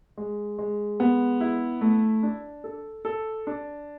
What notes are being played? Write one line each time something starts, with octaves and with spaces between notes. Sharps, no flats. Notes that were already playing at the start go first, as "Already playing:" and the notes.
G#3
G#3
B3
E4
A3
D4
A4
A4
D4